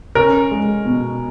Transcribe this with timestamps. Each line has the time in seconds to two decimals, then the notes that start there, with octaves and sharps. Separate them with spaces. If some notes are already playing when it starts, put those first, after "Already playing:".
0.15 C#4 A#4
0.51 G#3
0.85 B2